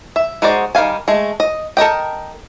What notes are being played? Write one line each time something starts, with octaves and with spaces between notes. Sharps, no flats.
E5
G#3 D#4 F#4 C5 D5
D#3 G3 F5 G#5
G#3 A3
D#5
A4 A#4 D#5 G5